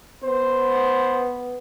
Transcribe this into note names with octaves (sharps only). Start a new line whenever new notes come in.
B3 C5